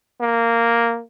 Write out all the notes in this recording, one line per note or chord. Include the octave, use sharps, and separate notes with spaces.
A#3